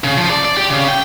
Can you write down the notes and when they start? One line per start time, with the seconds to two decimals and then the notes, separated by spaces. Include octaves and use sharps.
0.04 C#3
0.17 F3
0.30 D5
0.45 D5
0.57 G4
0.70 C#3
0.88 G5